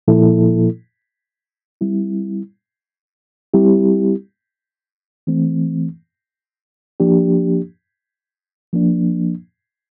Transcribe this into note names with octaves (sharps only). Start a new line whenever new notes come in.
A#2 F3 A#3 E4 A4
G3 C4 E4
G3 C4 E4 G4
E3 A3 C4
F3 A#3 D4 G4
F3 A#3 D4